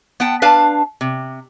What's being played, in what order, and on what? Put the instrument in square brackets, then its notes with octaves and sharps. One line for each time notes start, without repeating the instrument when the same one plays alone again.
[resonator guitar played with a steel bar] B3 F#5 G5 A5
D4 B4 F5 A5
C3